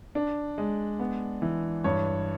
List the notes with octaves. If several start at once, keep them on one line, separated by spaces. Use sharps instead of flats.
D4
G#3
B3
E3
G2 C#5